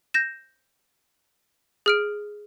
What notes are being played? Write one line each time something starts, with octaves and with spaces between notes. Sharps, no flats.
G6 A#6 E7
G#4 F6 D7